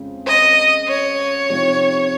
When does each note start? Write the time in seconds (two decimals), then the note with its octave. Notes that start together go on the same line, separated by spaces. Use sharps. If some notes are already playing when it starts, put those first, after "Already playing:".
Already playing: F2 C#3 G#3 C4
0.27 D#5
0.88 C#5
1.49 C3 F3 C4 D#4